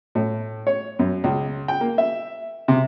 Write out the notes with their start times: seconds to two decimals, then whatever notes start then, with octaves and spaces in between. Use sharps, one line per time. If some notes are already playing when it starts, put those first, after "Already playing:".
0.15 A2
0.67 C#5
0.99 F#2
1.24 C#2
1.68 G5
1.81 A#3
1.98 E5
2.68 C3